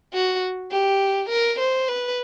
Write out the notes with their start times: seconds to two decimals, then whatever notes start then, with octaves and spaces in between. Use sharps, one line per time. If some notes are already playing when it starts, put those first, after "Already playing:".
0.14 F#4
0.72 G4
1.29 A#4
1.59 C5
1.88 B4